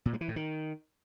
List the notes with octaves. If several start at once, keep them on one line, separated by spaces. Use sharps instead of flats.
A#2
G#3
E3
A2
D#3